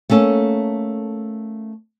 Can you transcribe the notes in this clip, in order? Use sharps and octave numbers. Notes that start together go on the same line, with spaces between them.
A3 A#3 C#4 A4